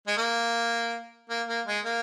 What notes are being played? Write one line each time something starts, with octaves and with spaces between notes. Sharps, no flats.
G#3
A#3
A#3
A#3
G#3
A#3